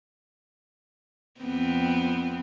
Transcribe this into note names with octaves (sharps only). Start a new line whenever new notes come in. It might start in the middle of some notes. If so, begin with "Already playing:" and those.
F2 B3 C4